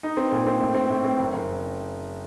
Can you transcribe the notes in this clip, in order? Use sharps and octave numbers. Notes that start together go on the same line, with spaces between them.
D#4
C4
A#2
C4
A2
C4
A2
C4
F#1
F#1